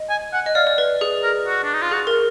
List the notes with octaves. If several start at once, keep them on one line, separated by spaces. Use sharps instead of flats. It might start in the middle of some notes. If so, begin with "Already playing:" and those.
Already playing: D#5
G#5
F#5
D#5
D5 F5
D5
B4
G#4
A#4
F#4
D4
D#4
F4
F#4 G#4
A#4